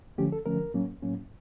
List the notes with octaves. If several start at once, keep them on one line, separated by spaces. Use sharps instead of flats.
D3 F3 A3 C#4 G4
A4
D3 F3 A3 C#4 A#4
A2 F#3 A#3 C#4
A2 F#3 A#3 C#4